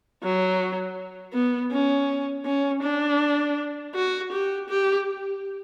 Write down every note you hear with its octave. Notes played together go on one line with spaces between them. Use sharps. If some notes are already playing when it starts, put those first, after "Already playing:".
F#3
B3
C#4
C#4
D4
F#4
G4
G4